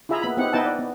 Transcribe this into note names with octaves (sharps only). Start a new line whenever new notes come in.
E4 F4 G#4 E5 A#5 B5
A#3 B3 B5
B3 C4 D#4 E4 G4 F#5
B3 D#4 E4 D#5 G5 A5
D5
B3